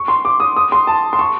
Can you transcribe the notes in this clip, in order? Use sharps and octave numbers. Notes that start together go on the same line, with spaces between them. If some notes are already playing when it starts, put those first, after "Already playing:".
Already playing: C#6
C6
D6
D#6
D#6
C6
A5
C6
C#6